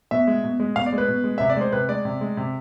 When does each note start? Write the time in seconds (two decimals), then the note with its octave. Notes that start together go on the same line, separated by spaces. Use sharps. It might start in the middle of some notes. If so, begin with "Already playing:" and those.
0.11 B2 E5
0.27 G#3
0.44 B2
0.60 G#3
0.76 B2 F5
0.86 D5
0.93 G#3
0.98 B4
1.08 B2
1.24 G#3
1.38 C3 E5
1.50 D5
1.57 G#3 C5
1.72 C3 B4
1.89 G#3 D5
2.05 C3
2.21 G#3
2.37 C3